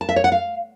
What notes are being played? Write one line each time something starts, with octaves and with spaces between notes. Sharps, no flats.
A5
E5
C#5
F#5
F5